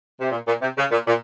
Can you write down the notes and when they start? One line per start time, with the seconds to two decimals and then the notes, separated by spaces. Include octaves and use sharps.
0.20 C3
0.30 A#2
0.46 A#2
0.61 C3
0.77 C#3
0.91 A#2
1.07 A#2